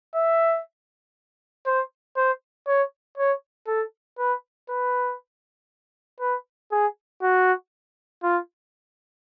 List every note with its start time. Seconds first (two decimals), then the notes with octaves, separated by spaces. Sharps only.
0.15 E5
1.66 C5
2.16 C5
2.67 C#5
3.17 C#5
3.68 A4
4.19 B4
4.69 B4
6.20 B4
6.72 G#4
7.22 F#4
8.23 F4